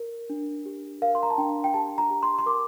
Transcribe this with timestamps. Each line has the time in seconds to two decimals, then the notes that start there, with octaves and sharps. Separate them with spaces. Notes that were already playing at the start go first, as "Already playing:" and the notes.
Already playing: A#4
0.30 D4
0.66 G4
1.02 A#4 F5
1.15 C6
1.23 A#5
1.30 A5
1.38 D4 G5
1.64 G5
1.74 G4 A5
1.98 A#5
2.10 G4
2.23 C6
2.39 C6
2.46 A#4 D6